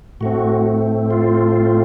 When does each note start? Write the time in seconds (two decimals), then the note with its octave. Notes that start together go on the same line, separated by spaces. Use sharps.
0.21 A2 A3 C4 F#4
1.11 F4